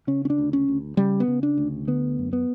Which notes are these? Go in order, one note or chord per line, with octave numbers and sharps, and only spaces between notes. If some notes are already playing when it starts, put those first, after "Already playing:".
C#3 C#4
C#4
D4
D2
C#4
D2
C#3 G3
B3
C#3
D4
D2
D3 B3
F#2
B3